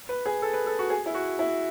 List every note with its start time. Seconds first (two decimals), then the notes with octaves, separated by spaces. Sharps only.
0.09 B4
0.26 G#4
0.42 A4
0.53 B4
0.67 A4
0.79 F#4
0.90 G#4
1.06 E4
1.15 F#4
1.39 E4